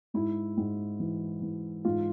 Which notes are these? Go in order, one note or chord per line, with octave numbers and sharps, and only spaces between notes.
G#2 E4
G#2
E3
E3
G#2 F4